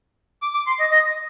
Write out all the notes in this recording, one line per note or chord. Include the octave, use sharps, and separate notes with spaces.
D6
D6
C6
D#5
D#5